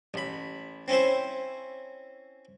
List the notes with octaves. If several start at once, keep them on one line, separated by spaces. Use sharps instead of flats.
A1 B5
C4 C#4 E4 C5